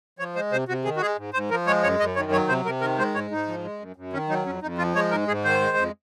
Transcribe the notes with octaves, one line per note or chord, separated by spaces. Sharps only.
F3 C#5
G#3 C5
C3 C5
C3 F#4
D#3 G#4
F#4
G#3 G#4
G#2
G#2 C5
F3 A#4
G#3 C#5
F#2 C#5
F#2 D#5
D#3 C#5
F#3 C#5
C3 C5
C3 A#4
D#3 A#4
G#3 C5
G#2 C#5
G#2 D#4
F3
G#3
F#2
F#2
D#3 C#4
F#3 D#4
F2 C#4
F2 D#4
F3 F4
G#3 C#5
G#2 A#4
G#2 G#4
D#3 C5
G#3
F2